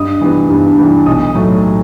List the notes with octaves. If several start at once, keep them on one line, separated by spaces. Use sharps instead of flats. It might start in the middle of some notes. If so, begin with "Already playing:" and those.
Already playing: G2 D#5 D#6
E3 G3 B3
G2
E3 G3 B3
B1 D#5 D#6
A2 F#3 A3